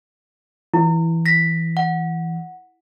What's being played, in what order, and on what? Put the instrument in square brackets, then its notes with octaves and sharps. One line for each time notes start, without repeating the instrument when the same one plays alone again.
[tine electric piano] E3 [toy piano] E4
[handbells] A#6 B6
F#5